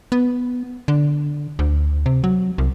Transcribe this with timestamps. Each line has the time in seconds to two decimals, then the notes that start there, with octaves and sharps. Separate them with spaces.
0.12 B3
0.88 D3
1.59 D2
2.06 C3
2.24 F#3
2.58 C2